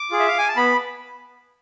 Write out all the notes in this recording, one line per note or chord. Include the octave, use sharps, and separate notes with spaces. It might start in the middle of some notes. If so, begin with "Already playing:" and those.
Already playing: D6
F4 G#4
E5
F5
G#5
A5
B3 B5